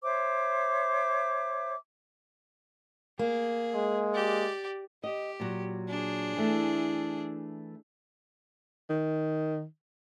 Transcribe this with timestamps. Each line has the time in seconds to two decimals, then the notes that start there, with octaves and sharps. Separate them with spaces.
0.03 C5 C#5 E5 D6
3.19 A#3 G#4
3.75 G#3
4.14 G4 D5
5.04 G4 D#5
5.40 A#2 F#3
5.89 D4 G#4
6.37 E3 A3
8.90 D#3